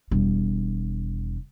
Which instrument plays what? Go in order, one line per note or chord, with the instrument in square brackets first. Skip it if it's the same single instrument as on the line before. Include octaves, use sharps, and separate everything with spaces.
[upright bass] E1 G3